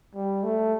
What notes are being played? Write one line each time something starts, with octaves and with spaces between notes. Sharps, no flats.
G3
A3